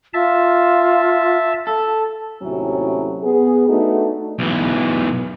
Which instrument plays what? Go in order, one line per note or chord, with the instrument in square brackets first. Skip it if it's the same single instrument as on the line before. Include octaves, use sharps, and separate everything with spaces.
[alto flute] F4 [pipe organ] E5 A5
[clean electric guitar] A4
[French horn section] D#2 A2 C3 F#3 C#4 E4
B3 G#4
A3 B3 D4 D#4 F#4 A4
[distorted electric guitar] B1 E3